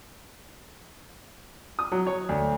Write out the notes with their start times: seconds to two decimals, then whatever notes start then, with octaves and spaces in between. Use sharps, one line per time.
1.79 D#6
1.92 F#3
2.07 C#5
2.29 D2